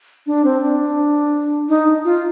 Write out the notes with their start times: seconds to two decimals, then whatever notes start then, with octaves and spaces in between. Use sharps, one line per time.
0.27 D4
0.45 C4
0.62 D4
1.69 D#4
2.05 F4